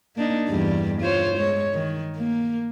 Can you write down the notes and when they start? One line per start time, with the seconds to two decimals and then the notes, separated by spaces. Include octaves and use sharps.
0.16 A#3 D4 D#4
0.49 E2 G2 G3
1.02 F4 C5 C#5
1.37 G#3 C#5
1.73 D#3
2.16 A#3